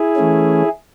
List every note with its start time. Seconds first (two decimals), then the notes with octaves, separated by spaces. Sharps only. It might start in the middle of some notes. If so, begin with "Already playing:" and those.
Already playing: E4 G#4
0.16 E3 A3 C#4